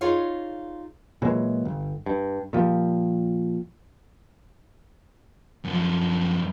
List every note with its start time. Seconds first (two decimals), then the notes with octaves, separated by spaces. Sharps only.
0.01 D#4 F4 G#4 C#5 D5 F5
1.22 A#2 E3 F#3 G#3
1.65 G1
2.06 G2
2.53 A#2 F3 G3
5.64 F#2 F3